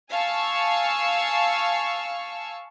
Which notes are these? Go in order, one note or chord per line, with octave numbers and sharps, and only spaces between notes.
F5 G#5 A5 C#6 E6